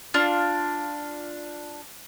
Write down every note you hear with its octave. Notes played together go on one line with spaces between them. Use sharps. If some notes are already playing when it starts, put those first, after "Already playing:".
D4 F4